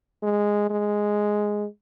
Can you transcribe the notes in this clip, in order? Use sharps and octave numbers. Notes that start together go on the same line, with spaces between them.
G#3
G#3